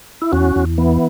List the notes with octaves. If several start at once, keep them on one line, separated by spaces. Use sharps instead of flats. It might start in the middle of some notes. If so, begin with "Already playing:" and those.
E4
E2 C#4 F#4
E2
E3 B3